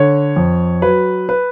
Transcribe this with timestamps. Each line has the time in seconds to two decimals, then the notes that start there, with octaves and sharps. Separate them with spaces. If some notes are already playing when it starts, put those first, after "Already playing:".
Already playing: D3 C#5
0.36 F2
0.82 F#3 B4
1.29 B4